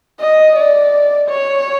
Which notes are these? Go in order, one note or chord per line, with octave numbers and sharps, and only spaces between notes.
D#5
D5
C#5